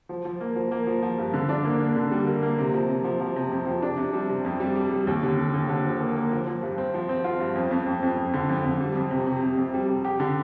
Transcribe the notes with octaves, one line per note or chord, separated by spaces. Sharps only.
F3
F3
A#3
F3
A#3
F3
F3
G2
D3
D4
A#3
A#3
D3
G3
A#3
A#3
C3
F3
C3
F3
F3
C3
F2
F3
D4
C3
G3
C3
F2
G3
G3
G3
D#2
D3
D3
D#2
D3
F3
A#3
A#3
F3
F3
G2
C4
F3
C4
F4
G2
F2
F2
F2
F2
F2
D3
F2
F2
G3
F2
C3
C3
C3
F2
G3
C3
G4
D3